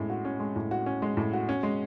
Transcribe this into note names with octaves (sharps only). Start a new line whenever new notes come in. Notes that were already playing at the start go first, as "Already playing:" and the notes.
Already playing: A2 G#3 C#4
F#4
C#4
G#3
A2
F#4
C#4
G#3
A2
F#4
C#4
G#3